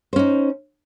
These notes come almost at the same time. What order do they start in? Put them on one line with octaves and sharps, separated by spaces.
C5 C#4 D#4